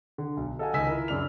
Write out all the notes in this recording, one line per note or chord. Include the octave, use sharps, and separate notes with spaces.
D3
B1
A4 D#5 F5 F#5 G#5
C#2 D#3 D#5 G#5 E6 B6
E4 A#4
F#2 C#3 D4 F6 F7